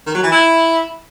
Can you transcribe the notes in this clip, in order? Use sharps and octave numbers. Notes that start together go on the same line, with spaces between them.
D#3
F#3
E3
E4